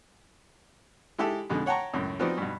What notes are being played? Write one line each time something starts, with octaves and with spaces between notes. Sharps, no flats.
G#3 E4 G4 A4
F2 B2 D3 G#3
C#5 F#5 G5 A5 A#5 C#6
C#2 F#2 A2
F3 B3 C4 D#4 F#4 D5
G2 B2